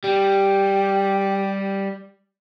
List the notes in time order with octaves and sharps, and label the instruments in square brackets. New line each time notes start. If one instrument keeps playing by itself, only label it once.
[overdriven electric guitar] G3 [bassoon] G4